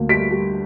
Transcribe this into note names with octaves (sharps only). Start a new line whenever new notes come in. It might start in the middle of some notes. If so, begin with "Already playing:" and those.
Already playing: D2 A#3
G3 B6 D7
G3